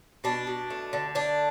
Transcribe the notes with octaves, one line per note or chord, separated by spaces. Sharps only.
B2 D4
B2
A3
D3
A3 D4